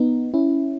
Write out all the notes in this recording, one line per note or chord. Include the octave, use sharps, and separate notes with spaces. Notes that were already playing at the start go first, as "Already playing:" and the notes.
Already playing: B3 D#4
C#4 E4